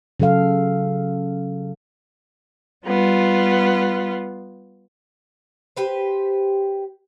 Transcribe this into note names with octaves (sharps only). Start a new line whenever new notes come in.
C#3 F#3 A4 F5
G3 B3 F4
G4 B4 C5